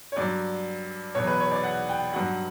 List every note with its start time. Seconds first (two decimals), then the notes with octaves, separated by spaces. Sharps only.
0.12 C#5
0.16 G2 F#3 D5
1.15 E2 B2 F#3 C#5
1.27 B4
1.40 C#5
1.51 D5
1.64 F#5
1.89 G5
2.13 G2 F#3 F#5